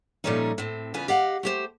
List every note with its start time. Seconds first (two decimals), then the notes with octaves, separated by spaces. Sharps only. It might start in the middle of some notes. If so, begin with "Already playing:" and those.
0.24 A#2 F3 G3 A3 C#4 D#4
0.58 A2 C4
0.94 E2 C#3 F4 B4 G#5
1.08 G4 D#5 F5 F#5
1.43 A3 G4 C5